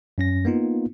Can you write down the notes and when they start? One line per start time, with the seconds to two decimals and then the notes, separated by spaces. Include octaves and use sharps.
0.18 F#2 C#4 A#6
0.45 A#3 B3 D#4 F4